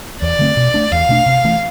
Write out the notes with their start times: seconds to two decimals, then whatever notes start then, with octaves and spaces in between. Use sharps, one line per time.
0.22 E2 D5
0.39 D3 A3 C4
0.57 B2
0.74 A3 D4
0.92 E2 F5
1.09 B2 A3 D4
1.26 C3
1.44 E3 A3